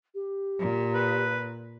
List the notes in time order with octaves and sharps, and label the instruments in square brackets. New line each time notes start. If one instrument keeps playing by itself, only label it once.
[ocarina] G4
[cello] A#2
[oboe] B4